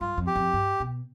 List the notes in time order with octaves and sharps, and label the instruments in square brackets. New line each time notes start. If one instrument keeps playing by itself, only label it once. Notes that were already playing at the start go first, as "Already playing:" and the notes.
[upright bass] G2 [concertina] F4
[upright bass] F2
[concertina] G4
[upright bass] F2
G2
B2